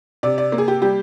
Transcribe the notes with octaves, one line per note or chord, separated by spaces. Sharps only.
C3 D5
D5
A#3
G#4
G4
G3 G4